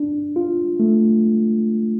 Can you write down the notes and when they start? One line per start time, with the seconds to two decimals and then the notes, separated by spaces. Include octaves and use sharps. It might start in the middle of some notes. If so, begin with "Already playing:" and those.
Already playing: D4
0.36 F4
0.80 A3